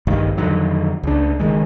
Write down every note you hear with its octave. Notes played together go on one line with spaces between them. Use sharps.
A#1 G2 D#3
F2 D3 D#3 F#3
C#2 D4
F#1 D#3 G#3